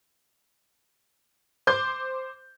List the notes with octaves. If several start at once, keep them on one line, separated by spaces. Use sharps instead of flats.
C5 C6 D6 G6